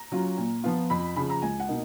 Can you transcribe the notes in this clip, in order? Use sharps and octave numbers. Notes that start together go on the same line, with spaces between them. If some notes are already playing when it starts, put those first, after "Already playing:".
Already playing: A#5
F#3 C#4 F4
A#2
F3 B3 F4
F2 B5
C#3 F3 B5
A#5
C#2 G#5
F#5
B2 A#3 D#4